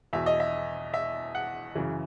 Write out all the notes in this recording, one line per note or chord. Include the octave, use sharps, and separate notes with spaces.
E2 B2 E5
D#5
E5
E5
F#5
F#2 C#3 E3